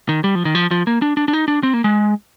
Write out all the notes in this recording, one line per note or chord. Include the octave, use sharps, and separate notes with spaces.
D#3
G3
F3
D#3
F3
F3
A#3
D4
D4
D4
D#4
D4
C4
A#3
G#3